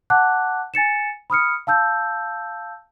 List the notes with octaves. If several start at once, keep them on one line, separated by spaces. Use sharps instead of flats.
F#5 A5 D6 F#6
G#5 A6 C#7 E7
B5 D#6 F6 C#7
F5 A5 E6 G6